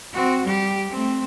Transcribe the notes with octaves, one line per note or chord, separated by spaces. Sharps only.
C4 F#4
G3 G4
A3 C4